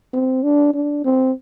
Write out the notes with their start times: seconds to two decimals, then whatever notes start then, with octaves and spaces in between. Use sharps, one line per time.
0.13 C4
0.44 D4
0.74 D4
1.04 C4